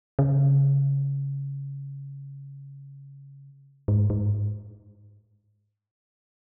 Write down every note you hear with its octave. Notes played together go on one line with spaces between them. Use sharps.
C#3
G#2
G#2